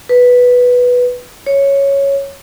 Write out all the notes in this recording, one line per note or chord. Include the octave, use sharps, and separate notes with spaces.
B4
C#5